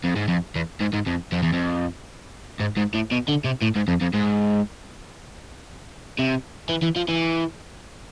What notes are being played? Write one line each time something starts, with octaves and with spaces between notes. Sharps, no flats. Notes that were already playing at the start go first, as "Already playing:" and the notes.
F2
G#2
F2
E2
G#2
G#2
F2
F2
E2
F2
G#2
G#2
A2
B2
D3
C3
A2
G#2
F2
F2
G#2
C3
E3
E3
F3
E3